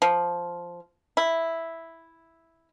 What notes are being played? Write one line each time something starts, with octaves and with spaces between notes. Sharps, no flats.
F3
E4